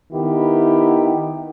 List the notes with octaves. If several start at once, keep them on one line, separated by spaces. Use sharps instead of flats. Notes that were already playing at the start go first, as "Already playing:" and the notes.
D#3 B3 E4 G4